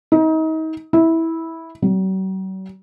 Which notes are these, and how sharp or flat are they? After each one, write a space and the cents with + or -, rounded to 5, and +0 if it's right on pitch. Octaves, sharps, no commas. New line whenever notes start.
D#4 +35
E4 -15
F#3 +45